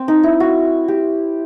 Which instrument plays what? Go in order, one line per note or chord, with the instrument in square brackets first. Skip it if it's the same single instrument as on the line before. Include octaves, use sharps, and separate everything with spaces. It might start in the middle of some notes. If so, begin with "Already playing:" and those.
Already playing: [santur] C4
D#4
E4
F#4
G4